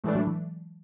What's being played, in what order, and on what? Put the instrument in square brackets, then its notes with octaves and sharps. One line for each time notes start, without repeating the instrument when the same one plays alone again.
[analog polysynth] A2 E3 A3 D4 [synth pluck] G#3
[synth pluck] F#3
E3